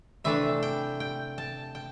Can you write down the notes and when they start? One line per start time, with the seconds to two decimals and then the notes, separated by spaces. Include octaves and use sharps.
0.24 C3 E3 A3 D4 E5
0.63 G5
1.00 G5
1.38 A5
1.75 G5